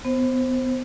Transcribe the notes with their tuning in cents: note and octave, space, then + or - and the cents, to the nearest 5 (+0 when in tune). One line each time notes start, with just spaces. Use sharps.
B3 +30 C5 +15